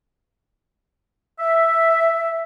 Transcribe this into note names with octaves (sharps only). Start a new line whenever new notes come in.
E5